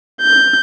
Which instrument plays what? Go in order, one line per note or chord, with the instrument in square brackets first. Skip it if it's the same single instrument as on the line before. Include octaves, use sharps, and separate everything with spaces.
[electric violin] G6